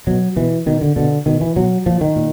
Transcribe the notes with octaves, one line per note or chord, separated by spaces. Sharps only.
B2 F#3
B2 E3
B2 D#3
D3
B2 D3
B2 D#3
E3
B2 F#3
A#2 F3
D#3
A#2